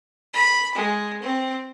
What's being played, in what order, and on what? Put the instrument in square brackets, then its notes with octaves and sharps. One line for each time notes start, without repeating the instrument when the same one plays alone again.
[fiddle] B5
G#3
C4